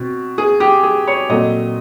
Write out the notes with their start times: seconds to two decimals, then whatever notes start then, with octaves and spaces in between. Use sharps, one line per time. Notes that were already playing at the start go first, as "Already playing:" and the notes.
Already playing: B2 C4
0.38 G#4
0.60 G4
0.83 G#4
1.07 C#5
1.29 A#2 F#3 A3 C4 D#5